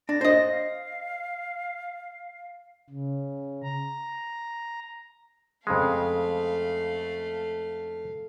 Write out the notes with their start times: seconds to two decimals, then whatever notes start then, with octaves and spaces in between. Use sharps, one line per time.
0.09 D4 A#6
0.21 C5 D#5
0.51 F5
2.90 C#3
3.63 A#5
5.67 F2 C#3 G#3 A3 F5